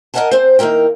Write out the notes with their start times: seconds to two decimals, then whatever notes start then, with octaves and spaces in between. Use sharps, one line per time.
0.14 A#4 D#5 F5 F#5 G#5 A5
0.31 C4 C5
0.59 D#3 A#3 E4 A#4 G5